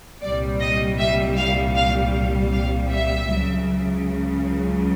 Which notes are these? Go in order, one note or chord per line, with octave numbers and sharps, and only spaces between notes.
C2 A#2 G3 D5
D#5
E5
F5
F5
F5
E5
C#2 C#3 F#3